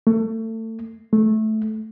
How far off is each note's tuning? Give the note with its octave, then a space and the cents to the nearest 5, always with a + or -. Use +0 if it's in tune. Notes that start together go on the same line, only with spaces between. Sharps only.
A3 +30
A3 -10